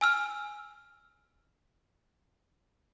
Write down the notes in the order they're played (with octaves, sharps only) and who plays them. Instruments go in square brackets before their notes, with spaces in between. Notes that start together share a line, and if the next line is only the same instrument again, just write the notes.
[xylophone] G#5 E6 F6